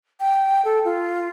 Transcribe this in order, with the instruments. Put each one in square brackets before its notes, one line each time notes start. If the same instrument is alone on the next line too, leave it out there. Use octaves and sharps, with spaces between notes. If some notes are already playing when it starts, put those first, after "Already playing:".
[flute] G5
A4
F4